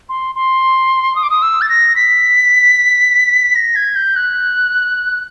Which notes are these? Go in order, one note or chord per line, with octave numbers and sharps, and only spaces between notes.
C6
C6
D#6
D6
D#6
E6
A6
A#6
B6
A#6
G#6
G6
F#6